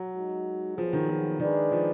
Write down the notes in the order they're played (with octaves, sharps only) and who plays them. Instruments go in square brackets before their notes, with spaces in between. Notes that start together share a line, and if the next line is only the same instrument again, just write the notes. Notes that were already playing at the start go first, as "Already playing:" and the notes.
Already playing: [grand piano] F#3
[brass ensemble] G#3 D#4 F#4
[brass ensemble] A#2 F#3 B3 F4 G#4 [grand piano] F3
[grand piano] D#3
F3
[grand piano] D#3 [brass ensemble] G#3 D4 G#4 B4 D5
[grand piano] F3